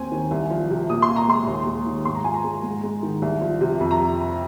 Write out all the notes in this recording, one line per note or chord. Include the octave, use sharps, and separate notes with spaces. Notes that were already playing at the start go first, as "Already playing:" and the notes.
Already playing: D#2 C4 G#5
D#3
C2
F3
C3
A#2 D#6
C6
F4
A#5
G#3 C6
D#2
G#3
D#3
G#2 C6
A#5
F4 G#5
A#5
G#3
G#2
G#3
D#3
C2
F3
C3
F2
A#5